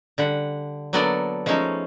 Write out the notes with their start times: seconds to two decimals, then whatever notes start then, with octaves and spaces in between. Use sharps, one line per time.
0.18 D3 G3 F#5
0.93 F#3 A#3 B3 D4 A4 D5
1.46 F3 G#3 A3 C#4 D#4